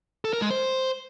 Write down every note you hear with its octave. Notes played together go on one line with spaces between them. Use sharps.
A4
A#4
G#3
C5